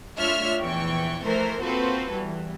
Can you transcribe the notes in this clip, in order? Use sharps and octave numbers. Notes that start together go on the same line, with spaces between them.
A3 D4 F4 C#5 E5 F6
A#1 E2 E3 G5 C#6
E3 F3 A3 A#4 C5
A#3 C4 F4 F#4 A4 B4
E2 E3 G3